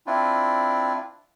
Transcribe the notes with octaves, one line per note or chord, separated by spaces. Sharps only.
C4 D4 E4 F4